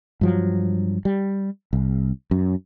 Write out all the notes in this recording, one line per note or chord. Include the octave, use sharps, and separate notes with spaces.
G2 F3 F#3
G3
C2
F#2